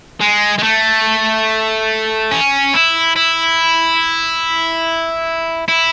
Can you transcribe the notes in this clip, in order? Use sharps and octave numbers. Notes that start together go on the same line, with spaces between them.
G#3
G#3
A3
C#4
E4
E4
E4